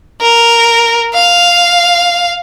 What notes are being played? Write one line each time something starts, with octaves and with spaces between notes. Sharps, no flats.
A#4
F5